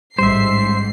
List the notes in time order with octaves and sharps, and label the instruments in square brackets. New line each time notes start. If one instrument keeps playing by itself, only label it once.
[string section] A1 G#2 C7 [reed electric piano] G3 [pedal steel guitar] C5 E5